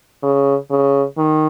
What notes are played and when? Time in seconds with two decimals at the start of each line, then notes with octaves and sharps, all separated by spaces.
0.22 C#3
0.70 C#3
1.18 D#3